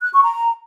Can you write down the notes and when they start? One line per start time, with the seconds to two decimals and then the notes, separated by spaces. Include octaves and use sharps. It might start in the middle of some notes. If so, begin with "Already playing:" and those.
0.02 F#6
0.13 C#6
0.23 A#5